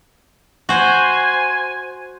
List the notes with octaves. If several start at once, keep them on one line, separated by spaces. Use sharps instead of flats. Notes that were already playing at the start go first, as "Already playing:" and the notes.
F#4 C5 G#5